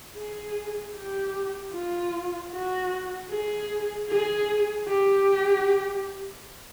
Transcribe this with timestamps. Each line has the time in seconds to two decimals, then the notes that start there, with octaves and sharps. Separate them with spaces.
0.16 G#4
0.96 G4
1.74 F4
2.52 F#4
3.30 G#4
4.09 G#4
4.88 G4